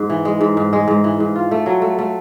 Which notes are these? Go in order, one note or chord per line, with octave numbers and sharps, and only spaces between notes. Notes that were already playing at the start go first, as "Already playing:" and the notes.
Already playing: G#2
E3
G#3
G#2
G#2
G#3
G#2
E3
G#2
F4
A3
F#3
A3
A3